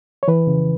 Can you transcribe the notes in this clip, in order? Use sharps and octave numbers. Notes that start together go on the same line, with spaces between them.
C#5
E3 B4
C#3